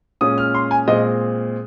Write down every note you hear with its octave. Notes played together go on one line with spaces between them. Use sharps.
A#2 G#3 C#4 F4 D#6
F6
C6
G#5
A#2 G#3 C4 F4 D#5